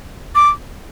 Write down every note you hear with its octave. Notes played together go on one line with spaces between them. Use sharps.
D6